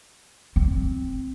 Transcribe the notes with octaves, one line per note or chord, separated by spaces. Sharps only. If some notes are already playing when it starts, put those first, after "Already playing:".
C4